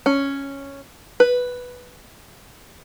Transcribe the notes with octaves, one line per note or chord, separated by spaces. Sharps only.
C#4
B4